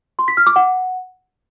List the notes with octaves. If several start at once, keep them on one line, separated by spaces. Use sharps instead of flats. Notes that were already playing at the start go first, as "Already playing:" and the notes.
C6
B6
F6
D6
F#5